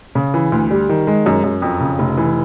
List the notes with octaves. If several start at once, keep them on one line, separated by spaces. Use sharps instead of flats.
C#3
E3
D2
G3
D#3
G#3
F#2
F#2
F2
C#3
F1
E3